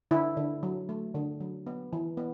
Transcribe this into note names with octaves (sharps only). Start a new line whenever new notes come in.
D3 E4
D3
F#3
A3
D3
F#3
B3
E3
B3